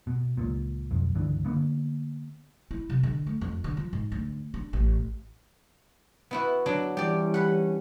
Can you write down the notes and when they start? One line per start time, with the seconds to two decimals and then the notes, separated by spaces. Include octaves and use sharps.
0.07 B2
0.37 C#2 A#2
0.91 B1 F2
1.15 C#2 G2 D3 E3
1.46 D3 A#3 B3
2.71 E4
2.90 C3
3.03 D3
3.26 A3
3.41 F2
3.64 D3
3.77 F3
3.93 G#2
4.12 D2
4.54 D4
4.73 A1
6.31 B3 E4 F#4
6.66 F#3 D4
6.97 E3 G3 C#4 G4 D5
7.34 F#5 B5